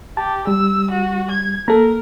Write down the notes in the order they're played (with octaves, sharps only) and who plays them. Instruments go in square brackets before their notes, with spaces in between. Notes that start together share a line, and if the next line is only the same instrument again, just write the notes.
[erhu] G4 [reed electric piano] A5
[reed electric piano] G3 [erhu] E6
[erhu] F#4
G#6
[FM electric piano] A#3 A4 [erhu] A#4 [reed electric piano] A#5